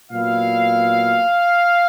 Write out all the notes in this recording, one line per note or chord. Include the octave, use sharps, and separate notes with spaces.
A#2 F#3 B3 E4 F5